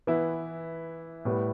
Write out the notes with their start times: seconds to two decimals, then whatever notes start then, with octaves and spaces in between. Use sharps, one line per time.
0.07 E3 B3 E4
1.25 A2 G3 B3 E4 B4